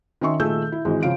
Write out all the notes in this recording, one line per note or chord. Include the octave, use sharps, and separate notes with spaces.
D#3 C#4 D#5 E5 C6 C#6
A#2 D#3 A3 G#4 E6 G6
E4
G#1 E3 G#3
C#3 F3 F5 D7